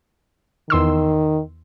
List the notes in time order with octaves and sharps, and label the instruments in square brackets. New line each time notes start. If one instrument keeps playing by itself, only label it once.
[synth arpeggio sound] E2 C6 E6 [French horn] D#3